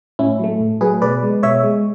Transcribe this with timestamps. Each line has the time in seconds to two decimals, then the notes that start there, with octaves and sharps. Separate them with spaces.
0.19 A2 C#4 E4
0.39 F#3 A3
0.60 A2
0.81 F#3 A3 G#4 B4
1.02 B2 B4 D5
1.23 G#3
1.43 B2 C#5 E5
1.63 G#3